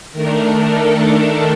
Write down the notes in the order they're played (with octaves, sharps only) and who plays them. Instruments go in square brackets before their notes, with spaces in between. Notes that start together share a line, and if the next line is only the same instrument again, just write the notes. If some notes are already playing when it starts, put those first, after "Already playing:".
[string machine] D#3 A3 D4 A#4
A4